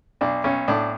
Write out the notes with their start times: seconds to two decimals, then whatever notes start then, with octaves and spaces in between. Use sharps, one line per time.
0.21 B1 D4
0.44 B1 C#4
0.68 A2 D4